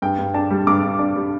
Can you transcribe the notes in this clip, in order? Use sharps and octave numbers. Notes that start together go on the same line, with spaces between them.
G2 G5
G2
D4 A5
G3
G2 D6
G2
D4
G3